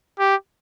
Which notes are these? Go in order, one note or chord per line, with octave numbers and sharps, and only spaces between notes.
G4